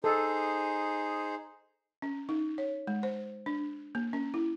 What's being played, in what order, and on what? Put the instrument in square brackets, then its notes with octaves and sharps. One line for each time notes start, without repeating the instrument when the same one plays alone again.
[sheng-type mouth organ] D#4 G#4 C5 [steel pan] A4
[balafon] C#4
D#4
C#5
G#3
C5
D4
A#3
C#4
E4